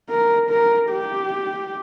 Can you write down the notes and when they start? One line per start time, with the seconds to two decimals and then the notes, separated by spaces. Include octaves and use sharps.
0.10 A#4
0.50 A#4
0.91 G4